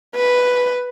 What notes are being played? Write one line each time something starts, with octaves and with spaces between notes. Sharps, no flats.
B4